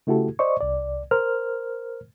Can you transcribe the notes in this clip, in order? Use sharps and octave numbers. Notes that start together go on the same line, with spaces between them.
C#3 A3 E4 F#4 G4 A4
C5 D5 D#5 C#6
C2 D5
A#4 C5 F6